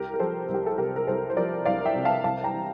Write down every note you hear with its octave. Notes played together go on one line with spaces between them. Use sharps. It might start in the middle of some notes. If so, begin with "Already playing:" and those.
Already playing: C2 G4 A#4
A#4
F3 A4 C5
C2
G4
A4
C3 G4 A#4
A#4
C2 A4 C5
C5
F3 A#4 D5
C2 D5 F5
E5 G5
C3
F5 A5
C2 F5 A5
G5 A#5
E3